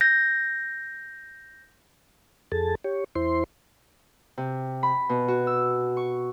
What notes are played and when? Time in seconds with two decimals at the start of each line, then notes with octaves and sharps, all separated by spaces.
0.01 G6 A#6
2.52 F2 G#4 A4 A5
2.84 G4 C#5
3.15 E2 E4 C5 C6
4.38 C3
4.83 B5
5.09 B2
5.28 F#4
5.47 E6
5.97 C#6